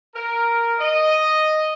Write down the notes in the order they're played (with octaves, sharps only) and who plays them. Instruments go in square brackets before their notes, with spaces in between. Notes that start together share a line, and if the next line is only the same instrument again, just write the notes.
[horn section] A#4
D#5